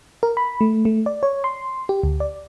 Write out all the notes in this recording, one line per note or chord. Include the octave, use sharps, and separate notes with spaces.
A#4
B5
A3
A3
D5
C#5
C6
G4
D2
D5